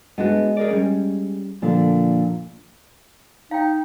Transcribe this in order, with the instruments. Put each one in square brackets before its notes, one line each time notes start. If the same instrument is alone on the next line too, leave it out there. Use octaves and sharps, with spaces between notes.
[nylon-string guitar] G#3 [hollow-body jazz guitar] B3 D4 F#4
[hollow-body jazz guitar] G#4 A#4 D5
G3 C#4
[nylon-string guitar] A#2 D3 [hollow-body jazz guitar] F3
[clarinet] D#4 [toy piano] F5 G5